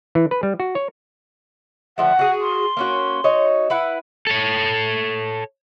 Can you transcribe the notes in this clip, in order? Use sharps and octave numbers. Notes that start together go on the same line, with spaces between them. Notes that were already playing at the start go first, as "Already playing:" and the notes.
E3
B4
G3
F#4
C#5
D3 F3 A3 F#5
F#4 G#4
C6
A#3 C#4 F#4
D#4 F#4 C#5
E4 B4 F#5
A4 C#5